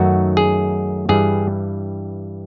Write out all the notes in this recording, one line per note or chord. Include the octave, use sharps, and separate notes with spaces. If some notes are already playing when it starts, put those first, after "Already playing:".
Already playing: F#2 D#3 F#3 A3 F#4
G#4
G2 E3 G3 G#4